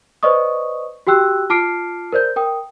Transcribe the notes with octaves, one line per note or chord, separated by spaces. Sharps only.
B4 C5 D5 D#5 C#6 D#6
F#4 G4 G5 E6 F#6
F4 A5 D6 F6 C7 D7
A#4 C5 D5 G6
A#4 G5 D#6